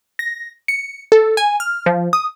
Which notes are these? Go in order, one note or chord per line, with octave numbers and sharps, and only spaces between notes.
A#6
C#7
A4
G#5
F6
F3
D#6